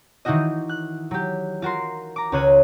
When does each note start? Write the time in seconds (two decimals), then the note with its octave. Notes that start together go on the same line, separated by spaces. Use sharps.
0.25 D#3 E3 D#4 E4 F#4 D#5
0.69 F#6
1.11 F#3 G4
1.62 F4 F#4 A#4 C6
2.16 A#5 D6
2.32 C#2 F4 C#5 F#6 G#6 D#7